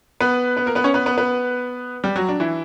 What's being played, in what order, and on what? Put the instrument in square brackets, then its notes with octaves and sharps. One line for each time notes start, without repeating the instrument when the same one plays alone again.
[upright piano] B3 B4
B3 B4
A#3 A#4
B3 B4
C#4 C#5
B3 B4
B3 B4
B3 B4
G3 G4
F#3 F#4
D4
E3 E4